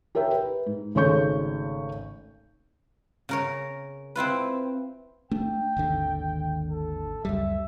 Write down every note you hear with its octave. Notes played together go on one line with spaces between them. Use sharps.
G4 A#4 C#5 E5 G5
B4
G#2
G#1 C#3 A3 C#5 C#6 G6
C#3 A#4 C#5
C4 E4 F4 B4
A3 D4 G5
G#1 D#2 D3
A4
C#2 F#2 G3 E5